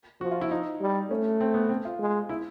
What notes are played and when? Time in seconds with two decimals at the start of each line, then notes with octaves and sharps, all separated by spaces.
0.21 F3 F#4
0.31 F4
0.41 E4
0.51 D#4
0.81 G3
1.10 A3 C#4
1.41 C4
1.54 B3
1.69 C4
1.85 F4
1.99 G#3
2.29 E4